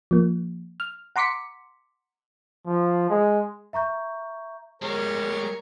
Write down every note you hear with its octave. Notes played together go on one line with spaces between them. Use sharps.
F3 A#3
F6
F#5 A#5 C6 D6 B6 C#7
F3
G#3
E5 A#5 C#6 G6
G3 G#3 A#4 C#5